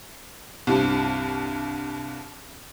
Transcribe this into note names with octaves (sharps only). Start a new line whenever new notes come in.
C2 G2